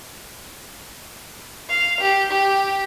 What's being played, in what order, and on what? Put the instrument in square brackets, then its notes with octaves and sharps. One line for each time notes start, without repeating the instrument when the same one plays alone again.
[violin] F5
G4
G4